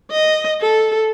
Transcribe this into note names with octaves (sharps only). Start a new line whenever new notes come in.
D#5
A4